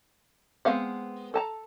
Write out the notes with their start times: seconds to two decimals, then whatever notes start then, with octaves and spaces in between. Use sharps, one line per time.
0.65 G#3 B3 C4 F5 F#5
1.34 A4 A5 A#5